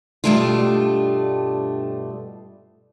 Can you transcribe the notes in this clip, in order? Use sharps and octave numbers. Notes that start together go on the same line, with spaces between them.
G2 B2 G3 A3 D4 F4